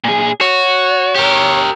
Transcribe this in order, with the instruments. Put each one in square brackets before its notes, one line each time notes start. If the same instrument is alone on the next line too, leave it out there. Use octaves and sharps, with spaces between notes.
[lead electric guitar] A#2 G#4
[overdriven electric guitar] F#4 [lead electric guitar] C#5
[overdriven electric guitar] G4 A#4